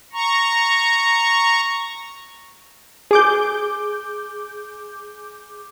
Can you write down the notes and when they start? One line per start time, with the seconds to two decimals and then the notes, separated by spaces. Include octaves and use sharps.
0.13 A#5 C#6
3.11 G#4 D6 G6